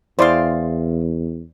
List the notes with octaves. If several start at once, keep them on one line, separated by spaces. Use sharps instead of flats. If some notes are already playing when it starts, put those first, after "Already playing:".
E2 E4 G#4 C5 D5 F5 C6